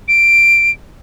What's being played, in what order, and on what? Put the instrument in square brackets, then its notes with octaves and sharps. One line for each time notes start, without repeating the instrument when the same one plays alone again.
[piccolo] D7